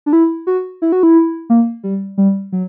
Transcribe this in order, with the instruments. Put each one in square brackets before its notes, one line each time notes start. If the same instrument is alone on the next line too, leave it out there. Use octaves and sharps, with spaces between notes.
[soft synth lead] D4
E4
F#4
E4
F#4
E4
A#3
G3
G3
F#3